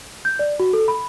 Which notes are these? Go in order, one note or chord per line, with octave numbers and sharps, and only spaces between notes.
G6
D5
F#4
A4
B5